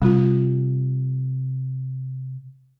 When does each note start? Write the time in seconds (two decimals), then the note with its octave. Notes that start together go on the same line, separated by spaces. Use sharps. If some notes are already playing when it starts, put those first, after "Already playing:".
0.02 C3 G3 F4